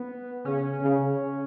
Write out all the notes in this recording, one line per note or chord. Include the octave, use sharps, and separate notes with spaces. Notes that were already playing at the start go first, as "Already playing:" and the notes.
Already playing: B3
C#3 C#4
C#3